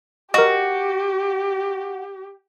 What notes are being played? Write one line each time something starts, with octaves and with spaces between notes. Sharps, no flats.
F#4 G4 A#4 D#5